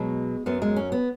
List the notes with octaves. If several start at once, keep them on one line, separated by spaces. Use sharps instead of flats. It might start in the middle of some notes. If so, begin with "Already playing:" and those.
Already playing: B2 F#3 G#3
F#2 F#3 B3
G#3
C#4
B3